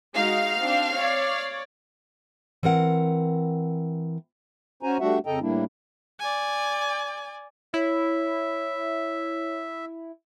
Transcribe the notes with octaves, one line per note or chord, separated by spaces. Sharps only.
G#3 D#4 F#4 F5
C4 D4
C#5 D5
E3 C4 A#4 F#5
C#4 F#4 C5 G#5 A#5
G3 A3 D4 F#4 E5 F#5
F2 C#3 A4 D#5 G5 A#5
A2 G3 A#3 D4 E4
D5 G#5
E4 C#5 E5